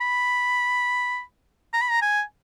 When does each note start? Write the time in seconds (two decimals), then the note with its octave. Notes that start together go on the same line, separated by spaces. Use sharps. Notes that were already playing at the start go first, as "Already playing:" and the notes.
0.01 B5
1.73 A#5
1.81 B5
1.90 A#5
2.02 G#5